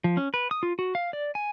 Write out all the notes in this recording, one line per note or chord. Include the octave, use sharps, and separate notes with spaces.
F3
C#4
B4
D#6
F4
F#4
F5
D5
G#5